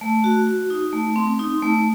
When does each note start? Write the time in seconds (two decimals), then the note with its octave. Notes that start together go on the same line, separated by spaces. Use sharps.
0.01 A3
0.24 F#4
0.47 F#4
0.70 D#4
0.93 A3
1.16 C4
1.39 D#4
1.63 A3